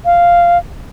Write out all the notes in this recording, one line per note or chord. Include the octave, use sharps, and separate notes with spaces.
F5